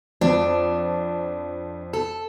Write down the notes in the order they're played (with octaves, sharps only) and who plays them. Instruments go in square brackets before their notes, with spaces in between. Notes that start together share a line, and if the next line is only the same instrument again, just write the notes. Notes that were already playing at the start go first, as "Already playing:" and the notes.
[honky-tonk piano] F2 [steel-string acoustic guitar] D4
[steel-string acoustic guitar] A4